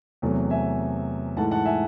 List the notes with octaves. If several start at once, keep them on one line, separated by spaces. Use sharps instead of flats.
E2 C3 F#3 A3
E5 G#5
G#2 E3 A3 F#5 A5
F#5 A5
E5 G#5